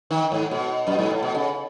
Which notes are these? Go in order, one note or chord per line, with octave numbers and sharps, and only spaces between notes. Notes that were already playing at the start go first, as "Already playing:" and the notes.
D#3
G#2
B2
F#2
G#2
A2
B2
C#3